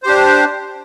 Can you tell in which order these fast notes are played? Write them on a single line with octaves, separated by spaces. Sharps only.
C5 G4 D4